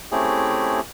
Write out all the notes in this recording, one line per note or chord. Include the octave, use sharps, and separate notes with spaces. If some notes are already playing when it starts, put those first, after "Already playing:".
A3 C4 C#4 E4 G4 G#4